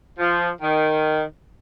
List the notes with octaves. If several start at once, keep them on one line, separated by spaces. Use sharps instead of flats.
F3
D#3